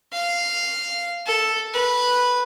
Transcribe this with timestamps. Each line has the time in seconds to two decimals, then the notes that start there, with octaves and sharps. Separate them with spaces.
0.13 F5
1.27 A4
1.74 B4